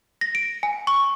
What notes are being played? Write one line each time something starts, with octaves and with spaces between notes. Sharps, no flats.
A#6
D7
G#5
C#6